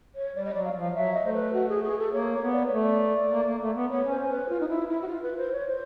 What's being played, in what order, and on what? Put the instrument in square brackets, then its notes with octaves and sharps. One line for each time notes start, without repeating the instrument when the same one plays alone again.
[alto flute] C#5
[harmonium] G3 [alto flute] D5
[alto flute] D#5
[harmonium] F#3 [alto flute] D5
[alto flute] F5
[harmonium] F3
[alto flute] F5
[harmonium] F#3 [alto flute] E5
[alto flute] D#5
[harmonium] A3 [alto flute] C5
[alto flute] B4
F#4
G#4
G#4
A4
[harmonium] A#3 [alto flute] C#5
[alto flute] C#5
[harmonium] B3
[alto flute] D5
C#5
[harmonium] A3
[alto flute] D5
[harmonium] A#3
A#3
A3
B3
[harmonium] B3 [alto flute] C#5
[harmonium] C#4
[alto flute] C5
[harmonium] C#4
[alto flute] B4
F4
D#4
E4
E4
F#4
F4
B4
C5
C#5
C5